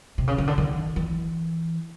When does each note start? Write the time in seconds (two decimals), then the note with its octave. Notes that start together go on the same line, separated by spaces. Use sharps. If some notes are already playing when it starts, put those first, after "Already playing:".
0.18 C3
0.28 C#3
0.38 C#3
0.47 D3
0.58 D#3
0.96 E3